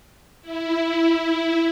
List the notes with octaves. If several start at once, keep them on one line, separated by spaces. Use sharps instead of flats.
E4